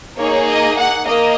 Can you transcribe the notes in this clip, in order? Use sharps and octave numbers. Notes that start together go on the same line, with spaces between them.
A#3 D#4 G#4 C#5
D#5
F#5
A#3 D#5